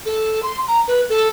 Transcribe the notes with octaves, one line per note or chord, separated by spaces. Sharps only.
A4
C6
A#5
B4
A4